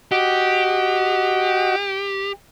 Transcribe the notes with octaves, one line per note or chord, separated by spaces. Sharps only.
F#4 G4 D#5 F#5